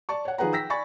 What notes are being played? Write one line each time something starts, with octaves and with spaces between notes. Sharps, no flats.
D5 A5 C#6
C#5 F#5
D#3 F3 G#4 B4 F#5 A#5
G5 E6 A#6 B6
D5 G#5 B5 C#6 A6